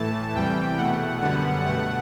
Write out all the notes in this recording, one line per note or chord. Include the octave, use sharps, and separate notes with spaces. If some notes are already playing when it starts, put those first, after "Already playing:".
Already playing: A2 E3 A3 A5
E2 C3 E3 G3 G5
E2 B2 A3 F#5
F#2 D3 G3 B3 F#5
B2 A3 F#5